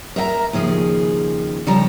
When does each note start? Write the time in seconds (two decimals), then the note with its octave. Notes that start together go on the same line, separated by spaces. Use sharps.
0.16 A#4 E5 F#5 A#5
0.53 D#2 C#3 F3 G#4
1.67 C#3 F3 G3 A4 A#5